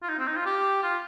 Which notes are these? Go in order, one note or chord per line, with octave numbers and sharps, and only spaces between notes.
F4
D#4
C4
D#4
F4
G4
F4